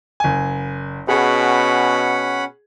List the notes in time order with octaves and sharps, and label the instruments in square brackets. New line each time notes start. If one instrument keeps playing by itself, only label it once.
[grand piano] F#1 G#5
[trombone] B2 [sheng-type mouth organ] C#4 F#5 B5 [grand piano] G#4